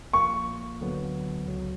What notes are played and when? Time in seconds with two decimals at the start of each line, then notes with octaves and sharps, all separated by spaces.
0.13 A#1 A#2 A#3 C#6
0.80 D2 D3 F#3 B3
1.46 C#2 C#3 F#3